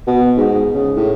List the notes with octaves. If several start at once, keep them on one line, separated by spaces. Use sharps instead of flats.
B2
G#2
C#3
A2